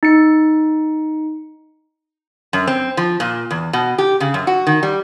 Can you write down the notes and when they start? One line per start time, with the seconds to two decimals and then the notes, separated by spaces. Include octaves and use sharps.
0.03 D#4 C#7
2.53 F#2
2.67 C4
2.97 F3
3.20 A#2
3.51 E2
3.73 B2
3.98 G4
4.20 C#3
4.34 F#2
4.47 F#4
4.67 D#3
4.83 G3